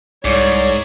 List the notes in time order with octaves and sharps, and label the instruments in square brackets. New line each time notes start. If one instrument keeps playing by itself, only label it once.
[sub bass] C2 [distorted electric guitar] G#2 [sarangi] C#5 [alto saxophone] D5